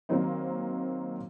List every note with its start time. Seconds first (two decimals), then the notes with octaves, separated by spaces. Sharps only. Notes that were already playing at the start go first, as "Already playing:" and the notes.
0.09 D#3 F#3 A#3 C4 D#4